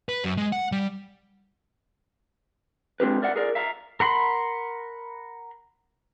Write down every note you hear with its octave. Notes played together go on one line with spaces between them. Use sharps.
B4
F#2
G#3
F#5
G3
G#3 C4 D4 G4 B4
A#4 D5 E5 F#5
G#4 A#4 D5
E5 F5 A#5
A#4 F#5 B5 C6